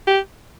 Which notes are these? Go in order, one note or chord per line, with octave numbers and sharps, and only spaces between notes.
G4